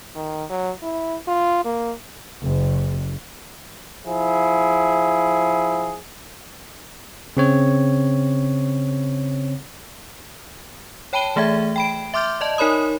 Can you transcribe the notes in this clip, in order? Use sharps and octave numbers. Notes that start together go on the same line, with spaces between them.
D#3
F#3
E4
F4
A#3
F#1
F3 E4 G#4
C#3 C4 C#5
C#5 G5 A5 B5 D#7 G7
E3 A3 G#4 E5 G#6
G5 B5 D7
E5 C6 D6 F6 G6
D5 D#5 A5
D#4 A#4 C#5 B5 D#6